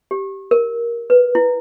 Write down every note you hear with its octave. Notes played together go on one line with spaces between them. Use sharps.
G4
A#4
B4
E4